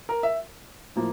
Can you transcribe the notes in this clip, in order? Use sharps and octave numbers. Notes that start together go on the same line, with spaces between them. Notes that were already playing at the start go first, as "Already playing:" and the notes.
A#4
E5
A2 F3 A#3